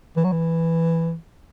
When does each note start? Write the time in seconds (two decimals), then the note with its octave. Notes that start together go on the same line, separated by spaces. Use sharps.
0.17 E3
0.24 F#3
0.32 E3